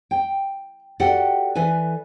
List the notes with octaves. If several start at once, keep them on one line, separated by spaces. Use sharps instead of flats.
G5
F#4 G4 A4 D5 F#5 G5
E3 A4 B4 G#5